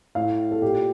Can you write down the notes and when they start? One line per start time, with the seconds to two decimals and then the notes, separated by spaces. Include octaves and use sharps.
0.15 A2 F5
0.51 A4
0.62 A#2 G4